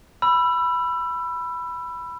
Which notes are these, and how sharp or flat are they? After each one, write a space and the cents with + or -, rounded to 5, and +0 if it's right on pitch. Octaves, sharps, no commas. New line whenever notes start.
B5 +0 E6 +25